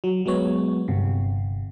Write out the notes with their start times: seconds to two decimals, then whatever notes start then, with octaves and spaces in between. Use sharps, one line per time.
0.04 F#3
0.26 F#3 G#3 B3 C#5
0.88 G1 C3